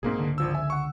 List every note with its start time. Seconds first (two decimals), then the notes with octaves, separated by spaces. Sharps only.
0.03 B1 G#2 A#3 C4 G#4
0.19 C#2 D3
0.38 G#1 F3 E6
0.54 E5 G#5
0.70 F#5 C#6